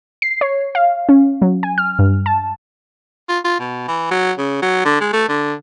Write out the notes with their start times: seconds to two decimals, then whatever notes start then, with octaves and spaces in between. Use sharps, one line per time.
0.22 C7
0.41 C#5
0.75 F5
1.09 C#4
1.42 F#3
1.63 G#5
1.78 F6
1.99 G2
2.26 A5
3.29 F4
3.45 F4
3.60 B2
3.88 E3
4.11 F#3
4.38 C#3
4.62 F#3
4.85 D3
5.01 G#3
5.13 A3
5.29 D3